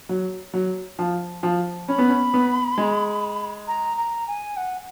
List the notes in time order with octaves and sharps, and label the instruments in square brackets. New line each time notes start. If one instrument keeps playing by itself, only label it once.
[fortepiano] F#3
F#3
F3
F3
[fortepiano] C#4 [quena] B5
[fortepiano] B3
C#4
B3
G#3
[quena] A#5
A#5
G#5
F#5